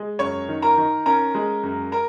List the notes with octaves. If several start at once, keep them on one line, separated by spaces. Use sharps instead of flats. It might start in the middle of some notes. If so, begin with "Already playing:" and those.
Already playing: G#3
F#2 C#5 C#6
D#3
A#4 A#5
D#3
C#4 A#4 A#5
G#3
F#2
A#4 A#5